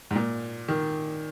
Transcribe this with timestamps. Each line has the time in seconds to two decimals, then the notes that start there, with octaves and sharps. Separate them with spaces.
0.11 G#2
0.15 A#2
0.68 D#3